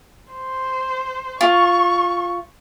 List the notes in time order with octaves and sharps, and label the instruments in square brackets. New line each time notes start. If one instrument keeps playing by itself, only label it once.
[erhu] C5
[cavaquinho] F4 [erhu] C#6